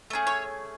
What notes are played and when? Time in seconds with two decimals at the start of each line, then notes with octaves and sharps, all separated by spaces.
0.10 A3 C#4 G#4
0.27 C#5